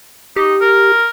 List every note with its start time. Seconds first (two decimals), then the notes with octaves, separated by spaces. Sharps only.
0.36 D#4 G4
0.61 A#4